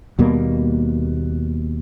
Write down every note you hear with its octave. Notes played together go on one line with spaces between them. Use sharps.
D#2 B2 G3 A#3